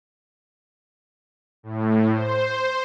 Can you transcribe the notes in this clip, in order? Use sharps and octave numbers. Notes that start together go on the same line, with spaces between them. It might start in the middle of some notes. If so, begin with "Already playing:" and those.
A2
C5